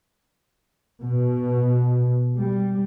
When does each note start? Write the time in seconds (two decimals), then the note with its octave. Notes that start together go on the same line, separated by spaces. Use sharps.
1.03 B2
2.38 G3